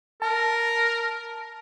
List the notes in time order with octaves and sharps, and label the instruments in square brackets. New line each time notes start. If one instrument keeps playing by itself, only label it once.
[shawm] A#4 [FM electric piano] A5